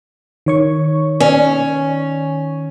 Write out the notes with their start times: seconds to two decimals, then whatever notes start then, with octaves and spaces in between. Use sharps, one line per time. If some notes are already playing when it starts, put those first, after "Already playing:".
0.46 D#3 C#5 C#6
1.20 C#4